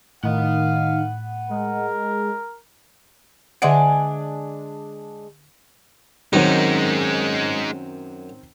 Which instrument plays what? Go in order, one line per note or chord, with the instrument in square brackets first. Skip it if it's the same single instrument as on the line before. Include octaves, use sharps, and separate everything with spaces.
[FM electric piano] A2 [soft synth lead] D#3 [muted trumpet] F5 [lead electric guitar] F#5 B5
[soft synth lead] G#3 [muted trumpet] A#4
[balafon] D3 E5 F#5 [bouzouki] G#3 D4 G#5
[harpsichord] F#2 [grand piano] D#3 C4 [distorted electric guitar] G#3 D#4